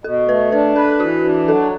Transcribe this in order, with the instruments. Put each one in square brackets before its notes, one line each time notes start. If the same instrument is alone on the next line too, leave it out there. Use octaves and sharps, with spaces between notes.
[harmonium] B2 [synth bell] A4
[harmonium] A3 [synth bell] B4
[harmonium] D4 [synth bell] B4
[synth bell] A4 [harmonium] B4
[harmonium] E3 [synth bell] F#4
[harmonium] D4
[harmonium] F#3 [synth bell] A4